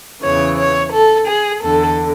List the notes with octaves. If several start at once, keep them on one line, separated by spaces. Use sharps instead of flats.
E2 C#3 E3 C#5
C#5
A4
G#4
E2 D3 A4